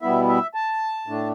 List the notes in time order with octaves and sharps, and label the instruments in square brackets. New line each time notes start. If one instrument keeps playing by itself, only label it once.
[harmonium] B2 G3 B3 E4 E5
E5
A5
A2 A3 D4